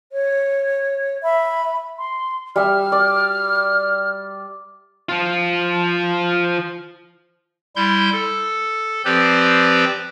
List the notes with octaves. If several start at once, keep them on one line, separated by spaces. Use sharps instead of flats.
C#5
E5 B5
C6
G3 E5 F6
D5
F3 F4
G3 E4 C6 G6
A4
F3 C4 G4 B4 C5 D5